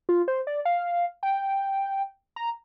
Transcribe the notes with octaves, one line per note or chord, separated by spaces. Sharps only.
F4
C5
D5
F5
G5
A#5